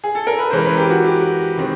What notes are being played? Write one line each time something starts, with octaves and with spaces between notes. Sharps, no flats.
G#4
A4
A#4
B4
E3 G#3 C#4 C5
A#4
B4
G4
F#4
G4
D#3 G#3 C4